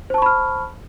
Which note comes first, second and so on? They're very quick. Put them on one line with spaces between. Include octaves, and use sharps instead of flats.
C5 A5 C#6 B5 F6